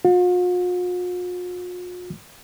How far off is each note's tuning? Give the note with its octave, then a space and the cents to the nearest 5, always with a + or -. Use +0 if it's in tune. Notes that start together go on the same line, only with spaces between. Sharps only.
F4 +45